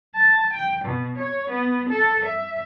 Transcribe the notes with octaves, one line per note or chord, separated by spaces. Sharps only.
A5
G5
B2
C#5
B3
A4
E5